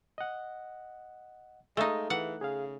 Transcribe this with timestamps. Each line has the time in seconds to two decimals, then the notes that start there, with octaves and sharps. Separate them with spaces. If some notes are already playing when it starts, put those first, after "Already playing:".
0.18 D#5 F#5
1.77 G#3 A3 D#4 G#4 F5
2.10 E3 F#5
2.41 C#3 G#4 F5